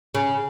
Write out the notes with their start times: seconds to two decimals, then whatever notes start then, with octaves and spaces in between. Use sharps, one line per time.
0.15 C#3